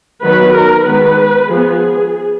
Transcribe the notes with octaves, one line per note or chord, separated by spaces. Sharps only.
D#3 F#3 B3 B4
A#4
D#3 G#3 B3 B4
F3 B3 G#4